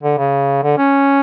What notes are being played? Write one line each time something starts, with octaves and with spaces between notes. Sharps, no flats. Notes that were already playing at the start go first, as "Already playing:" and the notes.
D3
C#3
D3
C#4